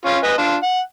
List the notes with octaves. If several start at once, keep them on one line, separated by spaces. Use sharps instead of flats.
C#4 F4
B4 D#5 G#5
D4 F4
F#5